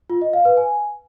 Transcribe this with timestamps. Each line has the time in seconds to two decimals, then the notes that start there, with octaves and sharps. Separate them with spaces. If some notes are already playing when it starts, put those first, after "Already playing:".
0.10 F4
0.21 D#5
0.33 F5
0.45 B4
0.57 G#5